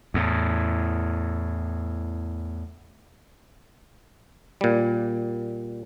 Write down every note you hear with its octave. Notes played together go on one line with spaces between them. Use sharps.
E2 A2
A#2 G3